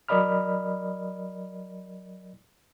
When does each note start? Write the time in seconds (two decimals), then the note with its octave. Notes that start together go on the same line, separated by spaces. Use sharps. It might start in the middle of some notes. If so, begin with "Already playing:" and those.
0.09 F#3 A#4 D5 D#5 B5 F6